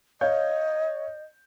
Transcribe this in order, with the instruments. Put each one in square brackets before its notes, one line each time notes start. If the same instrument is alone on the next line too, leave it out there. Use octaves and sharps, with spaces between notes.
[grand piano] C#5 F5 G6 [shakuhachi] D#5